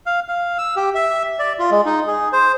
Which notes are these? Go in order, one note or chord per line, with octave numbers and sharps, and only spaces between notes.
F5
F5
E6
G4
E5
D5
F4
G#3
D#4
G#4
C5